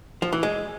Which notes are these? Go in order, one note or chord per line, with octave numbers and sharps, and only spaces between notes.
F3
E3
G#3